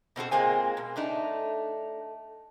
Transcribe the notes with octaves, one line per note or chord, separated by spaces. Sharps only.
B2 C4 F#4 A4
A#2 G#3 A#3 C4 G#5
B2
A3 D4 D#4